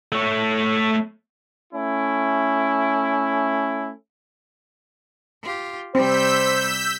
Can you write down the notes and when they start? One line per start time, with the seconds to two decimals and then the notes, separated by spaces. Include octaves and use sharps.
0.12 A3 C#5
1.73 A3 C#4 E4
5.43 F4 G4
5.95 C3 G3 C4 C5 E6 G6 B6